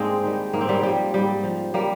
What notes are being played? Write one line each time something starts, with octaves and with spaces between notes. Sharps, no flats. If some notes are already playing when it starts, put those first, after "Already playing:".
Already playing: G#2 G#3 A#3 C4 D4
D#3 G3
G#2 A#3
C4
G3 A#3
F3 G3
G#2 G3
F3
G3 A#3